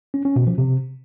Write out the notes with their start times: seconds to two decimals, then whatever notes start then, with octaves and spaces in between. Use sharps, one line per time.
0.14 C#4
0.25 C#4
0.36 B2
0.47 F3
0.58 C3